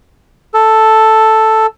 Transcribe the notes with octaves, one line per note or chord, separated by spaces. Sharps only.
A4